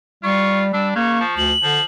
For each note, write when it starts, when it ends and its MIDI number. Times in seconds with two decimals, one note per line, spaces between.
0.24 0.70 55
0.24 0.65 65
0.24 0.59 85
0.73 0.94 55
0.73 0.93 62
0.73 0.89 88
0.96 1.16 49
0.96 1.22 58
0.96 1.35 85
1.20 1.53 53
1.37 1.53 38
1.37 1.84 102
1.63 1.78 50
1.63 1.83 53